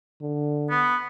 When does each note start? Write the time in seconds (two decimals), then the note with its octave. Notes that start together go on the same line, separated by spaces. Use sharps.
0.21 D3
0.70 B3